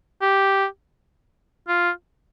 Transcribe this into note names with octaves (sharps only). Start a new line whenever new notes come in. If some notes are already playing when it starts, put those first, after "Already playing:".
G4
F4